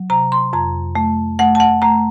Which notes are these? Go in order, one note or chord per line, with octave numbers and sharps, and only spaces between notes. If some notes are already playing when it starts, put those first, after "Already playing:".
Already playing: F#3
C3 A#5
C6
F2 A#5
A3
A3 F#5
A5
F#5
A3 A#5